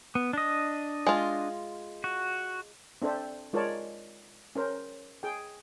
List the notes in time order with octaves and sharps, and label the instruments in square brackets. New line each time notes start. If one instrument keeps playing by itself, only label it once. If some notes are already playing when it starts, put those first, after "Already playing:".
[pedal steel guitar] B3
D4 D#5
[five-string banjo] G#3 F4
[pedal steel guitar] F#4
[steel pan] C4 D4 A4 C5 E5
G#3 F4 A#4 C#5 D5 A5
C#4 A#4 C5
G#4 G5